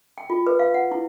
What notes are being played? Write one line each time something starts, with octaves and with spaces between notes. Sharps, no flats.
G5
F4
B4
F5
F#5
E4